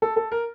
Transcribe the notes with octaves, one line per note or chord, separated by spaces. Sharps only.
A4
A4
A#4